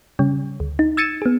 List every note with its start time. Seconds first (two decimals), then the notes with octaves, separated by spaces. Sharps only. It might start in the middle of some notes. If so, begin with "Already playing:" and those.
0.19 C#3 G3 C#4
0.60 D2
0.79 D#4
0.97 E6 G#6 A6 C#7 D#7 E7
1.22 B3 G#4